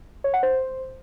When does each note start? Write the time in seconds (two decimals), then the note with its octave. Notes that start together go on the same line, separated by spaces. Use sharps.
0.24 C#5
0.34 F#5
0.43 C5